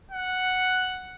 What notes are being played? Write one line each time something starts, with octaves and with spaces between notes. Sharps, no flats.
F#5